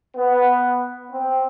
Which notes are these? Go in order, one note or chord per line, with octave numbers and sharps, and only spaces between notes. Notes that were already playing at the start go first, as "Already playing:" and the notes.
B3
C4